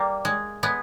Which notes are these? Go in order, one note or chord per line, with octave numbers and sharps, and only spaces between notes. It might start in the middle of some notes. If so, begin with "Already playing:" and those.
Already playing: G3 A#3
G#3
G#3 B3